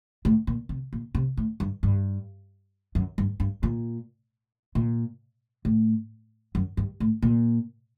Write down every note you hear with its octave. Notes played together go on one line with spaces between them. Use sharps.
A2
A#2
C3
A#2
C3
A2
G2
G2
F#2
G2
G2
A#2
A#2
A2
F#2
G2
A2
A#2